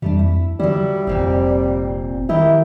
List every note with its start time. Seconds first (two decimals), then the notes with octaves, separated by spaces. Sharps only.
0.02 F2 G3 A3 D4
0.19 E4
0.60 D3 F#3 G3 E4
1.07 F1 F2 A#2 C4
2.29 D#3 E4 G4 A#4 D#5